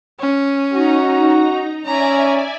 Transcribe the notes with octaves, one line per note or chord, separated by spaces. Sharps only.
C#4
D#4 F#4 A#5
C#4 D5 E5 G#5 A#5